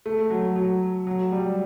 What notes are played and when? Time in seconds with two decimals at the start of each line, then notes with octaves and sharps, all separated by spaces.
0.06 A3
0.30 F#3
0.56 F#3
1.07 F#3
1.32 G3